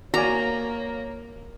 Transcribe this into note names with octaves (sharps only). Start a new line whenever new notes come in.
A#3 F#4 C#5 D5 G#5 A#5